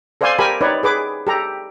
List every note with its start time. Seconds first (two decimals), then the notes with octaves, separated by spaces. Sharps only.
0.21 A4 C5 D5 F5 G#5 C6
0.39 G4 A#4 G#5 A5 B5
0.61 D#4 B4 C#5 D5
0.83 G#4 B4 D6
1.27 G4 A4 A#5